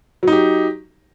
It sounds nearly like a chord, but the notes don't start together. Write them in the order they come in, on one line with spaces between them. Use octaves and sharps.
F#3 D#4 G4